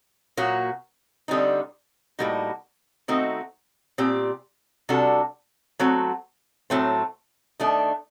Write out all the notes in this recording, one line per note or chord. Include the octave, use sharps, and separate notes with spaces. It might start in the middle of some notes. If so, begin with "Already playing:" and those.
A#2 F#3 A#3 F#4
D3 G3 C4 D#4
A2 G3 A#3 D#4 F#4
D#3 A3 C4 D#4 F#4
A#2 G3 C4 G4
C3 G3 D4 F#4 A4
F#3 A3 C4 F#4
A2 F#3 A3 C4
D#3 A3 D4